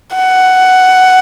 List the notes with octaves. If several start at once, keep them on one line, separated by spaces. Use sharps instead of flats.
F#5